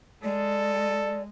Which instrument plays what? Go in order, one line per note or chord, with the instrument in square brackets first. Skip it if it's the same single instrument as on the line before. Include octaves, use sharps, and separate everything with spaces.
[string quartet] G#3 [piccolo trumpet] A4 [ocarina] D5